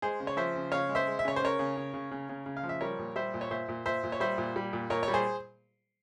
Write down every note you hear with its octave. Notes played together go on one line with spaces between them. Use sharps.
G#3 G#4 C5
C#3
C#5
F3 C5 E5
C#3
C#3 C#5 F5
G#3
C5 E5
G#3
E5
C#3 C#5
C5
C#3 A#4 C#5
C#3
C#3
C#3
C#3
C#3
C#3
F5
F3
E5
G3 A#4 C#5
A#2
G3 C5 E5
A#2
C#5
A#2 C5 E5
A#2
A#2 C5 E5
A#2
C#5
G3 C5 E5
A#2
G3
A#2
A#2 A#4 C#5
G3 C#5
G#4 C5